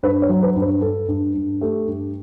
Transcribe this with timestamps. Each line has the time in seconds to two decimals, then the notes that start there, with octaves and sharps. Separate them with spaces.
0.03 G2 B4
0.22 C#5
0.29 F#3
0.43 B4
0.56 G2
0.62 B4
0.81 G2 A4
1.08 G2
1.34 G2
1.61 A3 G4
1.87 G2